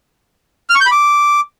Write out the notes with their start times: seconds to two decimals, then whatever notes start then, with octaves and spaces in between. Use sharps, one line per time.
0.70 F6
0.75 C#6
0.81 G6
0.86 B5
0.92 D6